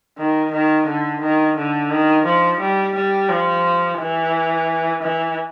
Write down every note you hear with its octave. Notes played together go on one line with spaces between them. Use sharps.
D#3
D#3
D3
D#3
D3
D#3
F3
G3
G3
F3
E3
E3